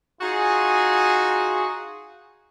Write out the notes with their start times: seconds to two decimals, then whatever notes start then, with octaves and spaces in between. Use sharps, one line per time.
0.21 D#4 F4 F#4 G#4